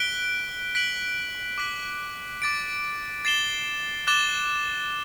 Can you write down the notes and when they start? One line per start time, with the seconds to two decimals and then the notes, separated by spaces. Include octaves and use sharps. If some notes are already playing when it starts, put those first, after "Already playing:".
Already playing: F#6 B6 D7 G7
0.75 F#6 B6 D7 F#7
1.58 D6 F#6 B6 F#7
2.42 D6 A6 D7
3.25 A6 C7 E7 G7
4.07 D6 F#6 A6 E7 G7